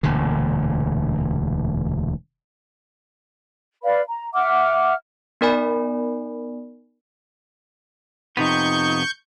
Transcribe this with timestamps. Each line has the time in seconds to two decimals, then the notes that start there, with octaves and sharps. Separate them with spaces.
0.03 E1 D2 A#2 D3
3.83 B4 D5 F5 B5
4.07 A#5
4.33 E5 F#5 D6 F6
5.41 B3 D#4 A#4 D5 G#5 B5
8.37 F2 C3 B3 D#4 C#6 G6